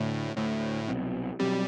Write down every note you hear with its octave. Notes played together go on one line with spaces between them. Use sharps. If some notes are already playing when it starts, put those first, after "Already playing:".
Already playing: D2 A2 D3 A3
D2 A2 D3 A3
C2 B2 F#3 C4
B2 F#3 G3 C4